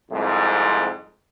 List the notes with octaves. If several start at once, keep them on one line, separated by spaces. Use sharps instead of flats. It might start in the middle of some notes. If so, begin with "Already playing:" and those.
C2 F2 G#2